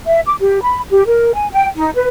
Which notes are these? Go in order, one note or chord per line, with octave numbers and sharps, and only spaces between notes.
E5
D6
G4
B5
G4
A#4
G#5
G5
D#4
B4